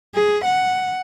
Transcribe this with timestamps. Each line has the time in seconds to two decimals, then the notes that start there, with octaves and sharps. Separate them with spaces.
0.15 G#4
0.45 F#5